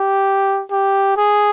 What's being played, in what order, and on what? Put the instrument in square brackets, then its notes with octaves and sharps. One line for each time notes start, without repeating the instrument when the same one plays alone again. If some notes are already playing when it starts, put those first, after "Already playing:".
Already playing: [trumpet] G4
G4
G#4